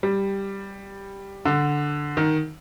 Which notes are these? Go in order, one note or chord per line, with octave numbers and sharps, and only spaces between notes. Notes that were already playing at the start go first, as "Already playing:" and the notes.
G3
D3
D#3